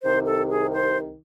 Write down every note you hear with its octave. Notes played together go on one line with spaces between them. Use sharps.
C2 C3 D#3 C5
A4
G#4
C5